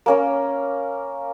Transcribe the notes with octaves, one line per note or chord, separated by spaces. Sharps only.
A#3 C#4 A#4